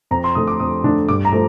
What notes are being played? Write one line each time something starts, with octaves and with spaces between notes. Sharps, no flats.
F2 A#5
C6
D3 A3 D4 D#6
D6
F2 D#6
D3 A3 D4
G2 D6
A#5
F3 A3